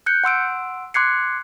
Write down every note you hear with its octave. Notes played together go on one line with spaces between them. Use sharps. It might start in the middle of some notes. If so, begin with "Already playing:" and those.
F#6 G6 C#7
F#5 C6 E6 D7
C6 D6 F#6 G#6 C7 C#7